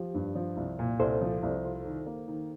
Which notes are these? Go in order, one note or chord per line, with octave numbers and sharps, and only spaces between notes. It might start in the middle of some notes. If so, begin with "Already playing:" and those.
Already playing: F3 G4
G2
F3
C2
A#2
C2 A4 C5
F3
C2
F4
D#3
A#3
D#3